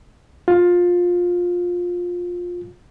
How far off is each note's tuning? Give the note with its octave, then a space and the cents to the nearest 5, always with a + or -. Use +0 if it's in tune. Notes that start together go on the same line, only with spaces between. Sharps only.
F4 +20